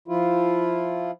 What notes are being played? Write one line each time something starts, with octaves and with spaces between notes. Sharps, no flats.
F3 E4 F4